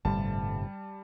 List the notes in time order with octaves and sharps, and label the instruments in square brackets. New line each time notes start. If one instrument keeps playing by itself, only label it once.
[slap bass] G1 A2 C3 [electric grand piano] G3 A5